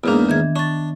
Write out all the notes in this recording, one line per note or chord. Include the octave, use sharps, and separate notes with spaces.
E2 G#2 A#3 B3 D4
D#3 E5 G#6
D4 C#6 A6